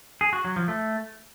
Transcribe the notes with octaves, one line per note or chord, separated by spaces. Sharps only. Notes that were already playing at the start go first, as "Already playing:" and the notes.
G#4
F#4
F#3
F3
A3